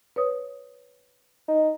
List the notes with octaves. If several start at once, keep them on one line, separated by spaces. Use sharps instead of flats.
B4 C#5 D#6
D#4